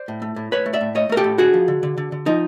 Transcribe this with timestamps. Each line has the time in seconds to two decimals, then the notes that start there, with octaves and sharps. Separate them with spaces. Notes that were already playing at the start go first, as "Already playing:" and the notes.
Already playing: C5 D5
0.08 A2
0.22 A3
0.36 A2
0.51 A2 B4 C#5
0.66 A3
0.73 D5 E5
0.81 A2
0.95 A3 C#5 D#5
1.09 A3 A#4
1.17 G4 A4
1.24 A2
1.38 D3 F#4 G#4
1.54 F3
1.68 D3
1.83 D3
1.98 D3
2.12 D3
2.26 F3 D#4